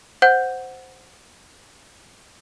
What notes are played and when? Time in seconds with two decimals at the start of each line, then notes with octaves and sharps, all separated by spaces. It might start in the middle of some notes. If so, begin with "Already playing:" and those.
0.22 C5 F#5 G6